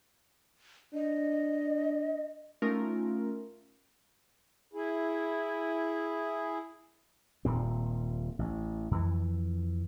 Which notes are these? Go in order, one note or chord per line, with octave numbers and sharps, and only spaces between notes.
D4 D#5
A3 C#4 D#4 F4 A#4
E4 G#4
D#1 A#2 C4
A1
F2 E3